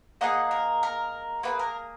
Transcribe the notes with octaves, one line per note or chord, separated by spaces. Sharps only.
A#3 D#4 G#4 D#5 F#5
A#4
A#4
A#3 F4 G#4 B4
A#4